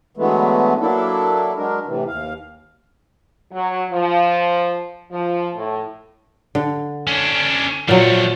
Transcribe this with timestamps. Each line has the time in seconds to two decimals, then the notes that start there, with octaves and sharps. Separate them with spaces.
0.17 D3 E3 F#3 G#3 A3 B3
0.81 F#3 A#3 D4 E4 A4
1.56 F#3 G#3 D4 A#4
1.86 A2 C3 E3
2.07 D#2 F5
3.52 F#3
3.91 F3
5.12 F3
5.56 A2
6.55 D3
7.07 C#4 D4
7.89 A#2 F3 F#3 A3